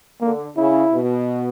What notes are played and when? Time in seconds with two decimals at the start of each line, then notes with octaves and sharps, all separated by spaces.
0.21 D3 A#3
0.57 C#3 E4
0.92 B2